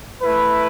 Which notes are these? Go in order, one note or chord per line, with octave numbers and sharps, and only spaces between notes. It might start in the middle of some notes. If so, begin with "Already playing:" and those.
A3 E4 B4